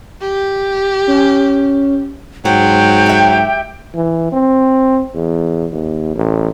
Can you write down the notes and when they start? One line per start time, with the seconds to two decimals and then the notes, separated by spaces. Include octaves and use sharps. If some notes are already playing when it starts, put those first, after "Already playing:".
0.21 G4
1.07 C#4
2.45 G#2 F#3 C5 G5
3.06 G4 E5
3.95 E3
4.32 C4
5.15 E2
5.72 D#2
6.15 A1